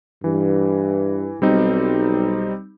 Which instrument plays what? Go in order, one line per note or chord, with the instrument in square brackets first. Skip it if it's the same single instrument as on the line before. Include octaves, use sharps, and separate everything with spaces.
[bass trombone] G2 [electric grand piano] E3
[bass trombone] B1 [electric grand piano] G3 C4 D#4